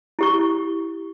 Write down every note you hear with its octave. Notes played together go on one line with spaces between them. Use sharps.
E4 G4 C#6